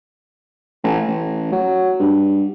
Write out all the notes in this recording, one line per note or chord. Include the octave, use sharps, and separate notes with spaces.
A1
A1
F#3
G2